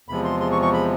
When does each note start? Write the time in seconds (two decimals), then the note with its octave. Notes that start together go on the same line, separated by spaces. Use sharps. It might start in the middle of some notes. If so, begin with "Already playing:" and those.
0.08 E2 C3 F3 G#3 B5
0.24 C6
0.40 C6
0.52 C#6
0.62 C#6
0.73 B5